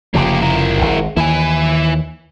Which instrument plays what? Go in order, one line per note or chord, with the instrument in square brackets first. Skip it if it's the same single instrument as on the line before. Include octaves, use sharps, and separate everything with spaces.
[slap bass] F1 C#3 F3 [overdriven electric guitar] A#3 G4
[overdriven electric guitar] E4 A#4
[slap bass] G#1
[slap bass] D#2 E3 [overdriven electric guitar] E4 G#5